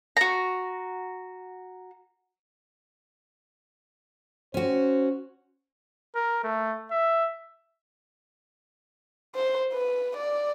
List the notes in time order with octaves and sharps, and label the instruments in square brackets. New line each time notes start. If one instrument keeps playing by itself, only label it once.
[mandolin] F#4 A#5
[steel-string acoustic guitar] C#4 F#4 [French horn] C5
[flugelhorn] A#4
A3
E5
[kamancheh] C5
B4
D5